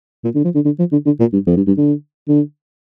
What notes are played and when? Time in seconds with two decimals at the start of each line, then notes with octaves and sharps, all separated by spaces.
0.24 A#2
0.35 D3
0.44 F3
0.55 D3
0.65 D3
0.79 F3
0.92 D3
1.06 D3
1.20 A#2
1.33 G2
1.47 F2
1.57 G2
1.67 G2
1.77 D3
2.28 D3